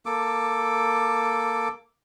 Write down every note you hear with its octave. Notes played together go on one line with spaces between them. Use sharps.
A#3 A4 D6